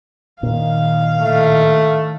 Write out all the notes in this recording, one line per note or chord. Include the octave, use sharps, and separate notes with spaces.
A#2 D#3 F5
A2 D#3 A3